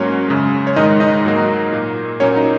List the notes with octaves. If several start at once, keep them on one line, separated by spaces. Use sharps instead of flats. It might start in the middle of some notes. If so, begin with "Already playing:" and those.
Already playing: G#2 F#3 A#3 C#4 C#5
F#2 C#3 G#3
C#5
G#2 D#3 G#3 D#4 D#5
D#4 D#5
G#2 F#3 A#3
A#2 A#3
A#2 F#3 A#3 C#4 C#5
D#4